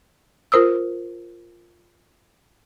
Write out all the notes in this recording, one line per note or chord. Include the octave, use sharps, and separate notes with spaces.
F4 A#4 C5 D#6 E6